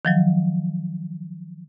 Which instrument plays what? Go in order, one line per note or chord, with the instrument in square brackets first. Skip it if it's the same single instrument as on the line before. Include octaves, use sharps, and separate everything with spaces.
[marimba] D#3 F3 F#3